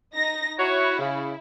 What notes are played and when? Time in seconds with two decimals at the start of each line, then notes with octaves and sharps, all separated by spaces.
0.13 D#4 A#6
0.59 E4 F#4 C#5
0.99 C#3